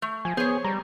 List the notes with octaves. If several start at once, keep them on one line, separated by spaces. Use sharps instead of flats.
A3
F3 G#5
B3 G#4 C5 C#5
G3 A#5